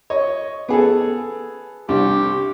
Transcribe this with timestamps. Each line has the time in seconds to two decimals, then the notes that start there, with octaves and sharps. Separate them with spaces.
0.10 C#5 D#5
0.69 B3 G#4 A4
1.89 C2 D4 G4